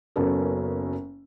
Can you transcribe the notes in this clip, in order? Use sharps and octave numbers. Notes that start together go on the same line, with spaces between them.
F#1 F#3 B3 C#4 A4 A#4